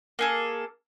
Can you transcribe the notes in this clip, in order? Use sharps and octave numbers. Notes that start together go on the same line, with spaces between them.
A#3 G#4 A4